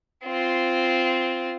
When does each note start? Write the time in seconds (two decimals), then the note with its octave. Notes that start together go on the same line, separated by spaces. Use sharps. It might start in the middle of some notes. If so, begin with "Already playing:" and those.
0.24 C4 F4